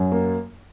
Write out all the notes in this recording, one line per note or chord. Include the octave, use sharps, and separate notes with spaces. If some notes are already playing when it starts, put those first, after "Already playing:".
Already playing: F#2 F#3
A#3